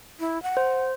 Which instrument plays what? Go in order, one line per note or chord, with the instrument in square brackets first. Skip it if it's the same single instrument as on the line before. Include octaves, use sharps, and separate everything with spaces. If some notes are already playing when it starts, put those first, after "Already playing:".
[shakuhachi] E4
F#5
[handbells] C5